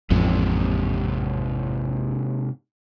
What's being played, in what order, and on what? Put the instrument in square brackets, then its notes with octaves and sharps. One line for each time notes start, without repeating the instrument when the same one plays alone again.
[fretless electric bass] A1 F2 [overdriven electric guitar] G#2 C3